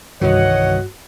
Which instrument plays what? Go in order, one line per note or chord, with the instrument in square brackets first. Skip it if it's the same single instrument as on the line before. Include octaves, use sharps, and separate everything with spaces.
[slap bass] C2 D#3 E3 [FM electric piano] G2 F#4 [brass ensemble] C#5 D#5 F#5